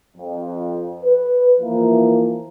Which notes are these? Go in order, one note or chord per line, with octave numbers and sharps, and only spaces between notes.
F2
B4
E3 F3 A#3